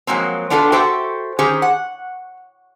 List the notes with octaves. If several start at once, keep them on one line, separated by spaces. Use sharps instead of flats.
F3 F#3 G#3 A#3 C4
B3 D4 F4 F#4 A4 B4
F#4 G4 A4 C5 E5 G5
D#3 C#4 G4 G#4 C5
F#5